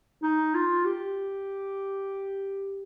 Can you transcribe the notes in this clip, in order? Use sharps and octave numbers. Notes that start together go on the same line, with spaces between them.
D#4
F4
G4